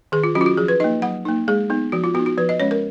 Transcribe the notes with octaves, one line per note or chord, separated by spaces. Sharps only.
D#3 G#4
F4
F#3 C#4 F#4
F4
F#4
F3 G#4
B4
A#3 D#4 D#5
F#3 F#5
A#3 D#4
G#3 G#4
B3 D#4
F3 F#4
F4
B3 D#4 F#4
F#4
F3 B4
D#5
G#3 C#4 C#5
A#4